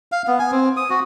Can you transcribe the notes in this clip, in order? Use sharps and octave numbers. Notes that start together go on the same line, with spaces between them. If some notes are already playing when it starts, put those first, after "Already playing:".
F5
B3
G#5
C4
D#6
F#4